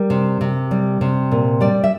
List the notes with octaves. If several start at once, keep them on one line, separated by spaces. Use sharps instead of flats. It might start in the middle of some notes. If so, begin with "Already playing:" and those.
Already playing: G3 A#4
C3
C3
G3
C3
A#2
G3 D5
E5